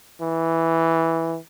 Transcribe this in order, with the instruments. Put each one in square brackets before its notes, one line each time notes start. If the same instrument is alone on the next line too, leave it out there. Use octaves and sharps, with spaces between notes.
[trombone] E3